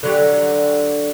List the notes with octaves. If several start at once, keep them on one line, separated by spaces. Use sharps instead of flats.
D3 F#3 G4